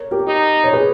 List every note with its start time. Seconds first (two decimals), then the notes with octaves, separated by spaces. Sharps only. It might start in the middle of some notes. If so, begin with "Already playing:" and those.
Already playing: A#4 C#5
0.11 G4 A#4
0.28 D#4
0.64 C#5
0.73 G#4 B4